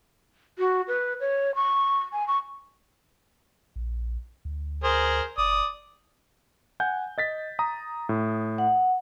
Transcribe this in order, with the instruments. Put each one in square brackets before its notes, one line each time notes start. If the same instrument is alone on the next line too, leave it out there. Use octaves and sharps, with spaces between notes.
[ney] F#4
B4
C#5
C#6
G#5
C#6
[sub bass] A#1
D2
[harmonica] G#4 A#4 C5
[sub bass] F#1 [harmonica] D5 D#6
[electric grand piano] F#5 G#5 G6
D#5 A6 B6
A#5 D#6
A2
[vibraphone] F#5